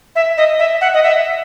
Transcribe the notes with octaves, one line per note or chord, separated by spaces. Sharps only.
E5
D#5
E5
F#5
D#5
E5